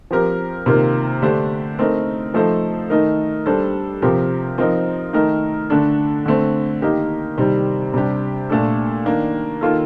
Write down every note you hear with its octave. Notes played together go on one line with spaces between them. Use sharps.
F3 C4 G4 A#4
C3 D#3 A#3 F4 A#4
D3 A3 D4 G4 C5
A3 C4 D#4 A#4
F3 A3 D#4 A4 C5
D#3 A3 D#4 A#4
G3 D4 A4 C5
C3 F3 C4 G4 A#4
F3 C4 D#4 A#4
D#3 A3 D#4 A#4
D3 A3 D4 A4
D3 A3 C4
D#3 A#3 D#4 G4 A#4
C3 D#3 G3 C4
C3 G3 D4 G4
A#2 A3 D4 A4
D#3 A#3 D4
D#3 A#3 F4 A4